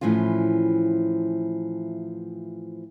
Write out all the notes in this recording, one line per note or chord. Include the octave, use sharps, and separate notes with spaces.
A2 E3 F3 C#4 F4